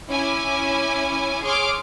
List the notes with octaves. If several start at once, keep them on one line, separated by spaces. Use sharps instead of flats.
C#4 E4 G#5 D6
G#4 C#5 C6 D6 F6